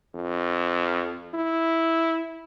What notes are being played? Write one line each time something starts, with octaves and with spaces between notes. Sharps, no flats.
F2
E4